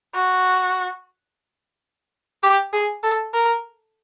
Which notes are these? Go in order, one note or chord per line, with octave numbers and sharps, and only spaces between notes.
F#4
G4
G#4
A4
A#4